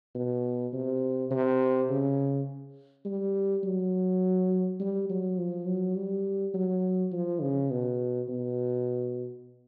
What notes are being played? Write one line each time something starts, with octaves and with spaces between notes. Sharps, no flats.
B2
C3
C3
C#3
G3
F#3
G3
F#3
F3
F#3
G3
F#3
F3
C#3
B2
B2